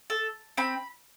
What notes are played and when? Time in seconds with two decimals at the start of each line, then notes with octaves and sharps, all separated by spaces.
0.10 A4
0.57 C4 B5